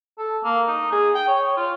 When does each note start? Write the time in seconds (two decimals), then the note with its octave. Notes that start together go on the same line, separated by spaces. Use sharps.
0.18 A4
0.44 A#3
0.67 D#4
0.92 G#4
1.15 G5
1.27 C#5
1.57 F4